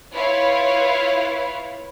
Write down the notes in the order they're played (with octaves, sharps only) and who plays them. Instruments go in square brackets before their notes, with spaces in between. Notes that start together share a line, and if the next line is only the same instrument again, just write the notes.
[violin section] E4 F4 B4 C#5 F5